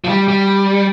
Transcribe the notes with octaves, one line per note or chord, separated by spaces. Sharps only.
F3
G3
G3